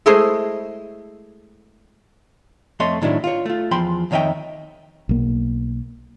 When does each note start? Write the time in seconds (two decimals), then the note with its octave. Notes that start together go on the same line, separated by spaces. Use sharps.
0.06 G#3 A3 E4 G#4 C5 D#5
2.80 F2 A3 A4 C#5 D#5 C6
3.02 A2 D#3 F#3 D4 E4
3.24 F4 C#5
3.46 A3 F4
3.71 E2 F3 G5 B5 C6
4.11 F2 D#3 C#5 D#5 E5 G5
5.09 B1 A#3